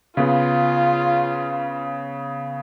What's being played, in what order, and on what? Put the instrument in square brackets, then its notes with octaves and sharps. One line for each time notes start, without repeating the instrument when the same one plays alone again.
[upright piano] C#3 B3 [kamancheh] F4